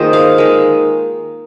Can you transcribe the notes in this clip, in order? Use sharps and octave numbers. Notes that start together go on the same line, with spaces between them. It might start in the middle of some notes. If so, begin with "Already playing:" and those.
Already playing: D#3 A#3 F4 G#4 C5 D#5
F5
D#3 G#3